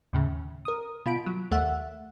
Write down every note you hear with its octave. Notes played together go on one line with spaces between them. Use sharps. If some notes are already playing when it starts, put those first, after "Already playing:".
D#2 A2 C#3
A#4 D#6
B2 F4 B5 D7
F#3
D#2 A3 E5 F#5